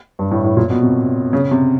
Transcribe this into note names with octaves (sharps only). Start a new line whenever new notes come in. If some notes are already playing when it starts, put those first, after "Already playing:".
G2
A2
A2
A#2
B2
C3
C#3
C3